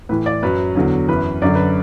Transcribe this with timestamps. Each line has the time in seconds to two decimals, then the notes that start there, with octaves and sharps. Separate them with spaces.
0.09 A2 E3 B4
0.26 D5
0.42 F#2 F#3 B4
0.75 E2 D3 F#3
1.08 F#2 E3 B4
1.42 F#2 D3 F#3 D5
1.55 B4